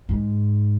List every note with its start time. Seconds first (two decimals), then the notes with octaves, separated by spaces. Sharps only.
0.09 G#2